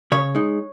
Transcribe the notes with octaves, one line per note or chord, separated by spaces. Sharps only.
C#3 C#5
G#3 D#4